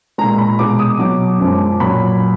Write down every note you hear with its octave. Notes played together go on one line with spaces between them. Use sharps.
A#2 G#3 A#5
B5
B2 G#3 D6
D#6
B2 F#3 D6
F#2 F3 G#3
A#2 F#3 B5